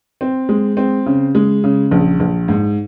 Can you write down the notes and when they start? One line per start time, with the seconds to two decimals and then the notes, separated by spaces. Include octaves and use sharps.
0.21 C4
0.49 G#3
0.77 C4
1.06 C#3
1.35 G#3
1.64 C#3
1.91 A#1
2.20 A#1
2.48 G#2